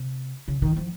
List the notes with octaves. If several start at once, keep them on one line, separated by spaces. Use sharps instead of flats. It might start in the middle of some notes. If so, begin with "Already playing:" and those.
Already playing: C3
C#3
D#3
F3